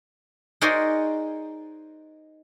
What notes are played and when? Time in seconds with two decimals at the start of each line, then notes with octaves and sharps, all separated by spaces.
0.61 D#4 F#4 G#4 A#4 C5 D5